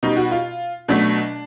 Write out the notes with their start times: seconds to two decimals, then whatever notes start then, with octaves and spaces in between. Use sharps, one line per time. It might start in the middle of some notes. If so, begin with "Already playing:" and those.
0.03 B2 G3 D#4
0.17 F#4
0.31 F4
0.88 B2 F#3 A3 D4